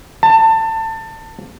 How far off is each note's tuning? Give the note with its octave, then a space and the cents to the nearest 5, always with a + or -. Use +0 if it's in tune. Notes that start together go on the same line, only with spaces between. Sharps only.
A5 +25